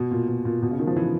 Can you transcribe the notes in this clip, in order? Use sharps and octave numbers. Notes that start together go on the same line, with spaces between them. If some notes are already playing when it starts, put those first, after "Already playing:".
Already playing: B2
A#2
B2
A#2
B2
C#3
D#3
F3
E3